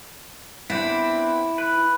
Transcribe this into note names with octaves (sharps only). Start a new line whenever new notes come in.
B3 C4 D4 E4
B4